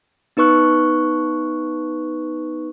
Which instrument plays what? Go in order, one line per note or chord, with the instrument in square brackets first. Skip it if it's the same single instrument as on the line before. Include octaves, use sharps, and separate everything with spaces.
[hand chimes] B3 D#4 B4 C#6 F#6